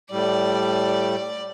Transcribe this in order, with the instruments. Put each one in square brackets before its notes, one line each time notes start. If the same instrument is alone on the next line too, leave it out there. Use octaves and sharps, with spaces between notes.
[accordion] A2 G3 [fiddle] D5